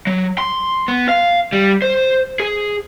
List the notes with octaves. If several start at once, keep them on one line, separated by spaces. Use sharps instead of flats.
F#3
C6
B3
F5
G3
C5
G#4